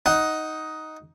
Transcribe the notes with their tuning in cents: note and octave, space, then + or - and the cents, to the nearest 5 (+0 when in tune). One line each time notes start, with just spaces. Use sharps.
D#4 +10 F#5 +10